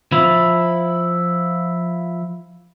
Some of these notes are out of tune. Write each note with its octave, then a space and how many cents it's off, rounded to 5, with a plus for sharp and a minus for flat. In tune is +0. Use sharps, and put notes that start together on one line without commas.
F3 +0 E4 +0